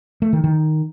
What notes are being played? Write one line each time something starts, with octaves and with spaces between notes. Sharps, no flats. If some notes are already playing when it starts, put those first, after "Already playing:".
A3
D#3
D#3